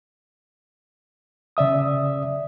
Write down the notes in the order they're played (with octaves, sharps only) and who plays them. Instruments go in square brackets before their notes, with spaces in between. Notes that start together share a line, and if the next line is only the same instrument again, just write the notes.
[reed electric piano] C#3 D5 E5 D#6